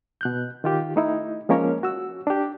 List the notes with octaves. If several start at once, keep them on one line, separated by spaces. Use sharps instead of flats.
B2 F#6 G6
D#3 F4 G4
A3 D#4 E4
F3 G#3 A#3 C#4 A#4 C#5
F#4 E6
D4 G4